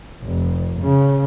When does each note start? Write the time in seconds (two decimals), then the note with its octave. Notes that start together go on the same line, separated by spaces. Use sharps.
0.22 F1
0.79 C#3